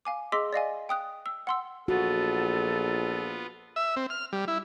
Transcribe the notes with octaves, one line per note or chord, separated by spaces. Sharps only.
F5 G#5 D6
G#4 D#5 C6 D6 E6 B6
D5 D#5 F5 G#5
G5 D#6 F#6
E6
F#5 C6 E6
A#1 B3 F4 F#4 A4
E5
C4
F6
G3
E4